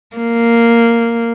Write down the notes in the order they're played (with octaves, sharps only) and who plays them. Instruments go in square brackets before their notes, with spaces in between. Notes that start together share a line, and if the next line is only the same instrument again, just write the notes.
[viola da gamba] A#3